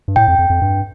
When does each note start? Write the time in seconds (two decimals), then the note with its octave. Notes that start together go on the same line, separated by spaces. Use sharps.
0.08 G2
0.16 A2 G5
0.28 F2
0.39 F2
0.50 F2
0.62 G2